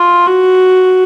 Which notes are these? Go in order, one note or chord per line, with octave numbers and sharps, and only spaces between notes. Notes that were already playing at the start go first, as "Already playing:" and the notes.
Already playing: F4
F#4